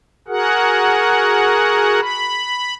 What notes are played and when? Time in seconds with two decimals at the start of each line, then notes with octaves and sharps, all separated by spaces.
0.28 F#4 G#4 A#4 F#5
2.00 B5